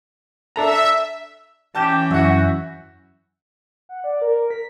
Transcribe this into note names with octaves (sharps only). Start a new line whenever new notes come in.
D4 A4 E5 A#5
E3 C#4 G4 A5 G6 E7
F#2 E4 F#4 E5 F#5
F#5
D5
A#4
B6